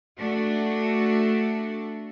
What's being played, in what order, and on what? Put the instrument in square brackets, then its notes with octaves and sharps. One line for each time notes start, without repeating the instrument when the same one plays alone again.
[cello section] A3 D4 F#4